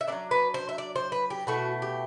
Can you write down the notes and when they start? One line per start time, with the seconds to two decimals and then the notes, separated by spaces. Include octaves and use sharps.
0.01 E5
0.08 B3 D4 D5
0.12 F#3
0.31 B4
0.54 C5
0.69 E5
0.78 D5
0.96 C5
1.12 B4
1.30 G4
1.47 B2 A3 E4 F#4
1.82 G4